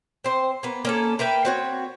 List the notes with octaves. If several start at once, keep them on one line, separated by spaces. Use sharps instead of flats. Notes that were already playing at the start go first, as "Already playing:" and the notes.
C4 C5
A#3 B3
A#3 C#4 A4
A#4 B4 E5 G5
C4 F#4 C#5